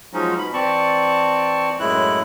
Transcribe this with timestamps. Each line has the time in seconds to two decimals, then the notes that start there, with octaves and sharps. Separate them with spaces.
0.13 F3 F#3 G#3 C#4 D#4
0.38 B2 B5
0.54 E3 C4 D5 A5 C#6
1.80 F#2 A2 G#3 E4 F#6